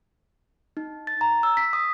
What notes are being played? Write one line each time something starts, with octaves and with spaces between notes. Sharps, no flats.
D#4
A6
A#5
E6
B6
D#6